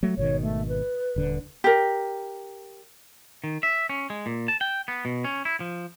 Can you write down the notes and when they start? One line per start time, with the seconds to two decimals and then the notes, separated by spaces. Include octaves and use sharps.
0.03 F#3 A3
0.17 G#1 B2 D#3 C#5
0.42 A3
0.68 B4
1.16 D#1 D3
1.64 G4 A#4
3.44 D#3
3.63 E5
3.89 C#4
4.10 G#3
4.26 A#2
4.48 A5
4.61 G5
4.88 B3
5.05 B2
5.24 C#4
5.45 E4
5.60 F3